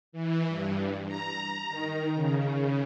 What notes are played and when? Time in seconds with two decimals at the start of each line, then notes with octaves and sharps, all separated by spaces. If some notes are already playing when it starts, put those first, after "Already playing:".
0.12 E3
0.48 G2
1.08 A#5
1.69 D#3
2.14 C#3